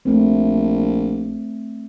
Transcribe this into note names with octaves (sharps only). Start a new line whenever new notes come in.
A#1 A3 C4